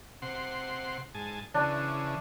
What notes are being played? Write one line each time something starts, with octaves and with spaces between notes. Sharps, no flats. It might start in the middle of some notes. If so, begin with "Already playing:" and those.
C3 F#5 C6
G#2 G#5 A5
C#3 E3 D4